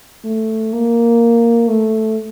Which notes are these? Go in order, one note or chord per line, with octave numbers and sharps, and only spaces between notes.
A3
A#3
A3